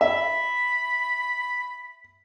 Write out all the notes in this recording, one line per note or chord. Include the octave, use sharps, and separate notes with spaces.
E5 B5